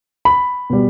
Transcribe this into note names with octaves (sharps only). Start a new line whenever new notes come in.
B5
B2 G3